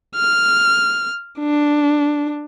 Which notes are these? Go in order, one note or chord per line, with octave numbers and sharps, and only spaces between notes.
F6
D4